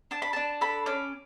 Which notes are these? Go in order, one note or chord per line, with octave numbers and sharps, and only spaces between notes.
D4 A5
B5
D4 A5
A4 B5
C#4 D6